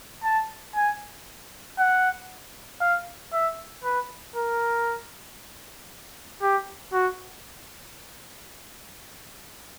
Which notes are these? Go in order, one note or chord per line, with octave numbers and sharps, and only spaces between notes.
A5
G#5
F#5
F5
E5
B4
A#4
G4
F#4